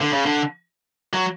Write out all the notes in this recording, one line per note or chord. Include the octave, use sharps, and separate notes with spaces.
D3
C#3
D3
F#3